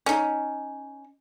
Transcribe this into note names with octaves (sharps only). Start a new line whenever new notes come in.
C#4 D#4